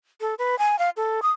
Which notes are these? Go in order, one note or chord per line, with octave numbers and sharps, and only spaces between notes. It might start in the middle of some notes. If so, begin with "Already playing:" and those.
A4
B4
G#5
F5
A4
D#6